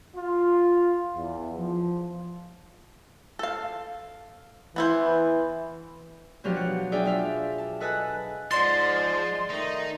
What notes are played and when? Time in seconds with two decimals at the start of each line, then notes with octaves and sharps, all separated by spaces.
0.16 F4
1.16 E2
1.57 F3
3.39 A4 F5
4.76 E3 B3 E4 C5
6.44 B2 F3 F#3 D4 G4 F5
6.56 F#5
6.92 D4 G#4 D5 E5 F5 G5
7.05 D4 F4 D5 E5 F5
7.58 A5
7.80 A4 B4 D#5 G#5 A5 F#6
8.51 G#2 F3 D5 C6 A6
9.50 D#3 A3 D#4